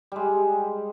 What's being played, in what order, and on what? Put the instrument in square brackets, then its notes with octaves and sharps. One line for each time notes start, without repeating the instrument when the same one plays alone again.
[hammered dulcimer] G3 G#3